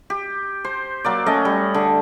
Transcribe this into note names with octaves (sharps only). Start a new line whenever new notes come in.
G4
C5
F#3 A#3 D5
A3 C#4 D#5
G3
D3